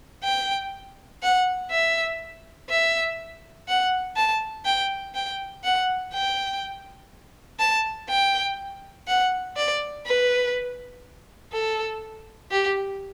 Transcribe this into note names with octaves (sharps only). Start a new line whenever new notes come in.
G5
F#5
E5
E5
F#5
A5
G5
G5
F#5
G5
A5
G5
F#5
D5
B4
A4
G4